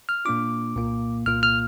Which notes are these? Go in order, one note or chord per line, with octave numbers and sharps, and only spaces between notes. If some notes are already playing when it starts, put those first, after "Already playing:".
F6
A#2 A#3 D4 F4 D6
C2 A#2 A#3 F4
C2 A#2 A#3 F4 F6
F6